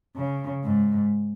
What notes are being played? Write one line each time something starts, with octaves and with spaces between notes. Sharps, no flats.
C#3
G#2